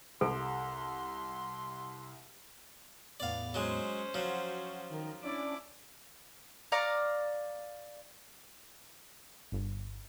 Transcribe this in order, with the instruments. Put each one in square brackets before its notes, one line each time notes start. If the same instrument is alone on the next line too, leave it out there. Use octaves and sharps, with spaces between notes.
[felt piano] C2 [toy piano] A4 [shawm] C6
[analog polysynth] E2 A2 B3 [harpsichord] D5 F5
[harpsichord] F#3 G#3 [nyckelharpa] C#4 C5
[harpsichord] F3 F#3 [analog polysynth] F#4
[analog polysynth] D#3 A#4
[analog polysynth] C#4 D4 D5 [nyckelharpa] E4 D6
[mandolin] D5 F5 A#5 C#6
[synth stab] G1